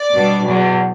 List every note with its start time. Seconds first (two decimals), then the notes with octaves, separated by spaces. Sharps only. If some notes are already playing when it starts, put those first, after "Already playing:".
Already playing: D5
0.12 B2 G3 D4
0.46 E2 B2 F#3